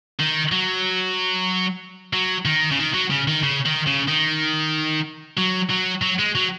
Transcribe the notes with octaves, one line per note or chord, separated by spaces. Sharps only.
D#3
F#3
F#3
D#3
C#3
D#3
F#3
C#3
D#3
C#3
D#3
C#3
D#3
F#3
F#3
F#3
G#3
F#3